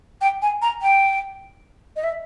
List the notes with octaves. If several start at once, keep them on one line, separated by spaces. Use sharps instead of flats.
G5
G#5
A#5
G5
D#5
E5